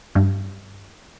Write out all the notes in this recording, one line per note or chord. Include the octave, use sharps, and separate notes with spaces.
G2